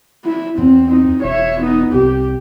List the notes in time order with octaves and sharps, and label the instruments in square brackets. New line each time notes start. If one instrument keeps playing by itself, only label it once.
[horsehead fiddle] E4
[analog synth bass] E2 [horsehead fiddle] C4
[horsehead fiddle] C4 D#4
[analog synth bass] E1 [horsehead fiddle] C#5 E5
[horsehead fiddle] B3 D#4
[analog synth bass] C2 [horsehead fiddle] G4